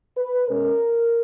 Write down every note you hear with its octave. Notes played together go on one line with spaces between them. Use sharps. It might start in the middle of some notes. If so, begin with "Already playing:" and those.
B4
B2 G#3 C#4 A#4